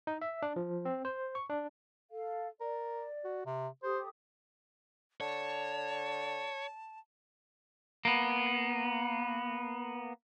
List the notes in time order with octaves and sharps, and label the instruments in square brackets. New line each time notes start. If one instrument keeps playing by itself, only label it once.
[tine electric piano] D#4
E5
D4
F3
C4
C5
C#6
D4
[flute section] A4 F5
[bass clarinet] A#4 [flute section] D5
[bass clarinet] F#4
C3
[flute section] G4 A4 D#6 [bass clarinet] C5
[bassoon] D3 [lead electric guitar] C#5 [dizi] A5
[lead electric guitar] A#3 B3